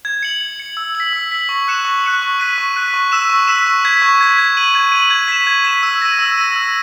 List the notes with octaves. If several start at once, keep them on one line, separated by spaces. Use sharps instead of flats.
G#6
C#7 F#7
G#6
C#7 F#7
E6
B6 F#7
E6
B6 F#7
C#6
F#6 C#7 E7
C#6
F#6 C#7 E7
C#6
F#6 B6 D#7
C#6
F#6 B6 D#7
C#6
E6 B6 E7
C#6
E6 B6 E7
C#6
G#6 B6
C#6
G#6 B6
G#6
D#7 F#7
G#6
D#7 F#7
G#6
B6 E7
G#6
B6 E7
E6
A#6 D#7
E6
A#6 D#7
E6